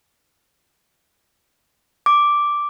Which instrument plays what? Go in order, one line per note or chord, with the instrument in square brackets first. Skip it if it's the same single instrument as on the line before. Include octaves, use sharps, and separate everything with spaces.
[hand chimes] D6